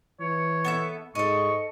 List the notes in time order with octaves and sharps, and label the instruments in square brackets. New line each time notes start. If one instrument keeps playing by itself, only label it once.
[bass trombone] E3 [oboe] C#5
[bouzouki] B3 A4 E5
[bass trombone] G#2 [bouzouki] A4 D#5 [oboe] C#6